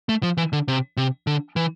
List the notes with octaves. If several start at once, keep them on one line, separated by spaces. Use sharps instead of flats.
A3
F3
E3
D3
C3
C3
D3
E3